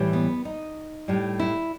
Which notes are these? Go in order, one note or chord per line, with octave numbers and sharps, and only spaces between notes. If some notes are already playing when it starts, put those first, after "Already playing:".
Already playing: A2 E3 G3
B3
D#4
A2 G3
E4